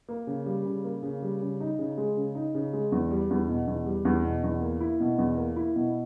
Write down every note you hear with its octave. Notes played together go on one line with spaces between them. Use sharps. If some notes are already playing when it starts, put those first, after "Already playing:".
A#3
C#3
G3
C#3
A#3
C#3
G3
C#3
D#4
C#3
G#3
C#3
D#4
C#3
G#3
E2
G3
E2
B2
E2
G3
E2
B2
E2
A#3
E4
B2
E2
A#3
E4
B2